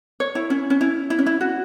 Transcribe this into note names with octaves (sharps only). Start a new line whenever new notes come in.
C#5
E4
C#4
C#4
E4
E4
C#4
E4
F#4